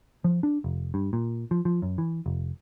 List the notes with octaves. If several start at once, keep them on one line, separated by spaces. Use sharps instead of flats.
F3
D4
F1
G2
A#2
F3
F3
F#2
E3
F1